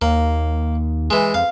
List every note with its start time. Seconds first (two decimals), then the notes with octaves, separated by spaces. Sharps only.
0.02 D#2 A#3
1.10 E3 G#3
1.34 F2 F5